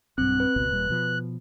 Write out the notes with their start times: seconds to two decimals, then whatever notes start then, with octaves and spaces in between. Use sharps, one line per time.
0.18 B1 G2 C4 F#6
0.40 B4
0.56 G1 C#2 B2
0.69 D#1 A#2 G3
0.90 B2 F3